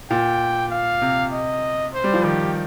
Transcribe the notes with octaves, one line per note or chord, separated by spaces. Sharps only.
A#2 G5
F5
C3
D#5
C5
G3
F3
D#3 G4